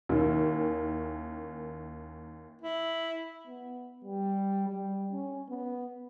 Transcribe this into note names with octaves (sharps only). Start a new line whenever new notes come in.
D#2 D#3 C#4 E4
E4
B3
G3
G3
C#4
B3